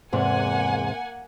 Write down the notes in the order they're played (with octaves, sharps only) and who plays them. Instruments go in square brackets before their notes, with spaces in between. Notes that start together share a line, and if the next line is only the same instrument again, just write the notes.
[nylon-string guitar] E2 G#2 C3 [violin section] A#3 F#5 G#5